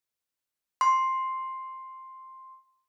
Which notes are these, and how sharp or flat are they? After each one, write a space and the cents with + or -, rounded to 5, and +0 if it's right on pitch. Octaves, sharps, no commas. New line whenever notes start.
C6 +5